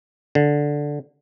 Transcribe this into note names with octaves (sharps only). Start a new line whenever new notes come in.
D3